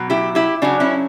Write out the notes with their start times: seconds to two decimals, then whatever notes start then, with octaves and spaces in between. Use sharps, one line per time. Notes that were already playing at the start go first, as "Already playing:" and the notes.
Already playing: B2 F#3
0.10 E4 G4
0.35 E4 G4
0.62 C#3 F#3 D4 F#4
0.80 C#4 E4